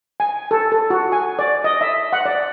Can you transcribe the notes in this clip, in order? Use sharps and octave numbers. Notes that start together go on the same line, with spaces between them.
G#5
A4
A4
F#4
G#5
D5
D#5
E5
F#5
D5